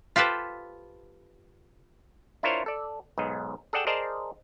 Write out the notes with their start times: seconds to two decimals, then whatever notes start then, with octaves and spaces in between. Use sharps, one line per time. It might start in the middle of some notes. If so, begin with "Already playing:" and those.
0.16 F4 G4 A4 B4 C5
2.43 D4 E4 F4 A#4 C5 C#5
2.66 A4 D5
3.18 B1 G#2 D#5
3.73 G#4 A4 D5 F#5 G5 A5
3.87 G#4 A#4 C5 D5 D#5 A5